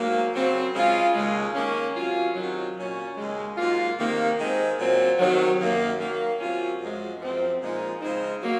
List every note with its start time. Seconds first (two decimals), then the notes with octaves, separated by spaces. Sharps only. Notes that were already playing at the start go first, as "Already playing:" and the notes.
Already playing: G#2 F#3 A#3
0.34 C#3 F#3 C4
0.74 C#3 G#3 C#4 F4
1.14 D#2 C#3 G#3
1.54 D#3 A#3 C#4
1.95 C3 F#3 C#4 F4
2.35 C3 D#3 F#3
2.76 A#2 F#3 C#4
3.16 D#2 C#3 G#3
3.57 G#2 F#3 A#3 F4
3.96 C3 D#3 A#3
4.37 D#3 G#3 C4
4.77 A#2 F#3 C4
5.19 C3 D#3 F#3
5.59 F#2 D#3 A#3
5.98 D#3 F#3 A#3
6.39 C3 F#3 C#4 F4
6.79 F#2 F3 G#3
7.20 F#2 F3 C4
7.60 A#2 F3 G#3 D#4
8.00 C#3 G#3 C4 D#4
8.41 F#3 A#3